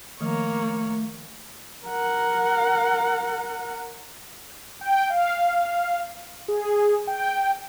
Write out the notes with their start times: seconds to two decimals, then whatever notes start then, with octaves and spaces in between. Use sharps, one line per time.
0.21 D#3 F3 A3 A#3 C#5
1.86 A#4 F#5
4.81 G5
5.10 F5
6.48 G#4
7.07 G5